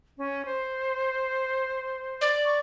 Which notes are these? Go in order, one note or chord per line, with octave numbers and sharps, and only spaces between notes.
C#4
C5
D5
C#6